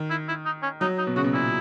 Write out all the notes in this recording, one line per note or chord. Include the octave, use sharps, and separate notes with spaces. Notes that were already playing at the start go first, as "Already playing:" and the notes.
Already playing: D#3
E4
E4
D#4
C#4
F#3 D#4
D#4
B2
C#3 F#4
B2
A#2 E4